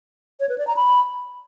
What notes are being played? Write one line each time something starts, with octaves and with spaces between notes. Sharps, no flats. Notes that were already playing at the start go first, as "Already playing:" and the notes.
C#5
B4
D5
A#5
B5